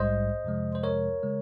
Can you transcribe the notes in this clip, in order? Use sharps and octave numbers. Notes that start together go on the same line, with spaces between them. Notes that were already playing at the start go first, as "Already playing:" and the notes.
Already playing: A#1 G#2 G3 C5 D#5
F2 C3 F3 G#3
C5
A#4 C#5
C#3 G#3